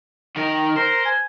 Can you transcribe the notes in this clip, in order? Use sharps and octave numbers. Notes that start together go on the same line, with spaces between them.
D#3 A#4
A#4 C5
G#5